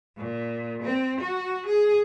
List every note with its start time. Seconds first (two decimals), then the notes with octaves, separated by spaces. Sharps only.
0.18 A#2
0.82 C4
1.21 F#4
1.67 G#4